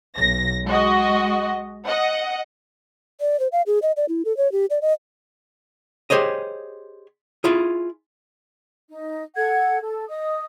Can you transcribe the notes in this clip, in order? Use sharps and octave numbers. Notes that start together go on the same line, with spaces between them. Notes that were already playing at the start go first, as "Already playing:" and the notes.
B1 A#6
G#3 F#4 D#5
D#5 F#5
D5
C5
F5
G#4
D#5
D5
E4
A4
C#5
G4
D5
D#5
G4 G#4 C5 C#5 D#5
E4 F4 G#4
D#4
A4 F#5 G#6
A4
D#5 D#6